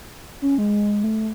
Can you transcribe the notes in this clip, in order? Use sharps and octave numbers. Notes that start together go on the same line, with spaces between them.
C#4
G#3
A3